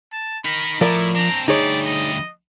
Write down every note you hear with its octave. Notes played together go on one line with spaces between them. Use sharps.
A5
D#4 A#4 B5
A2 F3 E4 A#4 D5
C4 D4 A#5
D2 G3 D#4 G#4 C#5 D5
D#5